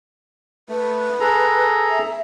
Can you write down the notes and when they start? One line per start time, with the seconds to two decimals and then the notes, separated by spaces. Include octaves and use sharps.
0.69 A3 B4
1.20 G#4 A4 A#5
1.89 E5